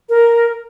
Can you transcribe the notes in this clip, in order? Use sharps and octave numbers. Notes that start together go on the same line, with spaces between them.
A#4